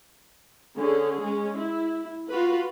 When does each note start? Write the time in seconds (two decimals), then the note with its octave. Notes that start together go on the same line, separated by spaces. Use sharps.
0.77 D3 C#4 G#4
1.21 G#3 C#4
1.56 E4
2.30 F4 F#4 B4